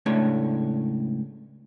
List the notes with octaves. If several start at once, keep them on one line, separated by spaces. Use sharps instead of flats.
C#2 A2 A3 D4 C#5